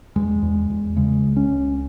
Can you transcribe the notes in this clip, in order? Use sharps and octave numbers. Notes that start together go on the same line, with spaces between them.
E2 G#3
E2
E2
C#3 G#3
C#2
C#4
C#2